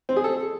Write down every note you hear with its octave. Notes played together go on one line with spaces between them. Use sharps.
C4
G#4
A4